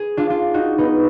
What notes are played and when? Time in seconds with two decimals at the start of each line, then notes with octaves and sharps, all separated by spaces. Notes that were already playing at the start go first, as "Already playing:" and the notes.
Already playing: G#4
0.17 D4 F4
0.30 D4 F4
0.54 D#4 F#4
0.78 B3 D#4